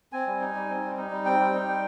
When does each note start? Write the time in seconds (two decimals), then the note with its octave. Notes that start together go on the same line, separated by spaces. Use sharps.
0.13 C4 G#5
0.27 G3
0.41 D#4
0.55 G3
0.69 C4
0.84 G3
0.97 D#4
1.11 G3
1.26 C4 G5
1.40 G3
1.54 D#4
1.68 G3